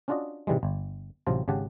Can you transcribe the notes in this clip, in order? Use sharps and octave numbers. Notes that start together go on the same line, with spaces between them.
C#4 D4 F4 F#4 D5 D#5
G#2 C3 E3 G3 G#3
G1
A1 C3 F#3 C4 F4 A5
G#1 C#3 G4 F#5 A5